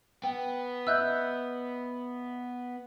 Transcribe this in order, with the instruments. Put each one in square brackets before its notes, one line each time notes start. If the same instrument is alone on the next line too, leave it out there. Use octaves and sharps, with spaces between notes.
[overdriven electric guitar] B3 [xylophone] G5
[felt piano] D#5 E5 [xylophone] E6 F#6 G6